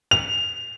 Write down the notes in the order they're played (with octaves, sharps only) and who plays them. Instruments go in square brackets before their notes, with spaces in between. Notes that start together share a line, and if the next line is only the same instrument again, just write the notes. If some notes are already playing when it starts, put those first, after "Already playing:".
[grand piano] F7